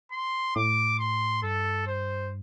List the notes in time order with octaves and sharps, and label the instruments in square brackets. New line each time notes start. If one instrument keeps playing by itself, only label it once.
[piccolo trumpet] C6
[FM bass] A2 [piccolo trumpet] D6
[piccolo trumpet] C6
[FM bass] G2 [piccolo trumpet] A4
[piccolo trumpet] C5